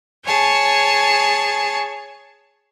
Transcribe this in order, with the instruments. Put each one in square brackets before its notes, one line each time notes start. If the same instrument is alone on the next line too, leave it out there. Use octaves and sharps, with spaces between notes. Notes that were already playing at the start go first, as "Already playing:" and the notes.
[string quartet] G#4 C#5 G#5 A5